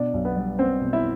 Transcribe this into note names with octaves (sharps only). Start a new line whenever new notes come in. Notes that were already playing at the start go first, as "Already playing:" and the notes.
Already playing: B2 D4 D5
B1
B3 B4
G3
B3 C4 C5
B2
E4 E5